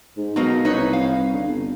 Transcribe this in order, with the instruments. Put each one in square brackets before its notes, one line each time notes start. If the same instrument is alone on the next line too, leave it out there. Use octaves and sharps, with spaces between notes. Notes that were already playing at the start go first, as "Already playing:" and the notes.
[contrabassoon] G#2
[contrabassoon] B2 [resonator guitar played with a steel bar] F#3 A#3 D#4
[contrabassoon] C2 [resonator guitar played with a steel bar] D#4 B4 C#5
[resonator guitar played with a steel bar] F5
[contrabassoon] D3
G1